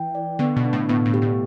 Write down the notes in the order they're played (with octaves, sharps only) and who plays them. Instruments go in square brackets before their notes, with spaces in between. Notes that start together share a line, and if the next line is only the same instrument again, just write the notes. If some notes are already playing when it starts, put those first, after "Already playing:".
Already playing: [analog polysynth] E3 [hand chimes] G5
[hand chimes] D5
[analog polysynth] D3 [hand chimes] B3
[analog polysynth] B2
[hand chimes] D4
[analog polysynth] A2
[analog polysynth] A2 [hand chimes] B3
[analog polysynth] A2
[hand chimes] G4
[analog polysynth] A2